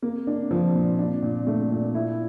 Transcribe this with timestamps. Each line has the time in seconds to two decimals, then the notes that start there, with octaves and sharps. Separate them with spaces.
0.02 A#3
0.27 D4
0.51 F3
0.74 A#2
0.99 D4
1.22 A#2
1.47 A3
1.70 A#2
1.95 E4